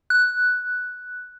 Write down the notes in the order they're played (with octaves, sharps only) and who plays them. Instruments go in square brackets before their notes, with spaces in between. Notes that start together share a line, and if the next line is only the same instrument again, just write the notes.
[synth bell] F#6